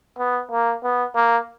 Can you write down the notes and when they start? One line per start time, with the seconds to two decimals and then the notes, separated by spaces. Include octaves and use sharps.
0.18 B3
0.51 A#3
0.84 B3
1.15 A#3